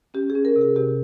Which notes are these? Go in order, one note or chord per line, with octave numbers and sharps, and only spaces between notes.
C#4 G4
G#4
C#4
A#4
C3
G#4
C3 G4